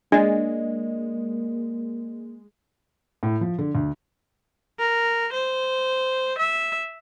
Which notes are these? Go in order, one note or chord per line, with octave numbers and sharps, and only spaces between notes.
G#3 A#3 D4 D5 D#5
A2
F3
D3
D2
A#4
C5
E5